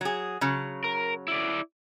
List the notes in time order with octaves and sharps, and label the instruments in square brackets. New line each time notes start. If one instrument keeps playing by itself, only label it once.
[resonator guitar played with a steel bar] F#3 G#4
C#3 F#3
[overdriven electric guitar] A#4
E4 D5